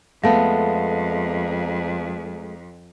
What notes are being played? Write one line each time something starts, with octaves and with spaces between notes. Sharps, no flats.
F2 G#3 A3 B3 F5 A5